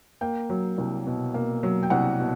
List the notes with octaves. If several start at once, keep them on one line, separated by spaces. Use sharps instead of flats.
A#3 G5
F#3
C2
B2
A#3
F#3
G5
C2 F#5
B2